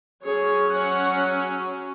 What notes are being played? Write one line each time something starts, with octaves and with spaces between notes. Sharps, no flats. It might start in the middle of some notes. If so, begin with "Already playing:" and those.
F#3 C#4 G#4 C#5
C#5 F#5